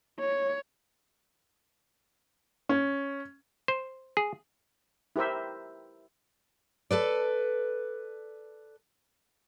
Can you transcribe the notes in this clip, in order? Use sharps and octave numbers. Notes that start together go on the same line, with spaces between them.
C#5
C#4
C5
G#4
E4 G4 A#4 C5 E5
A4 B4 D5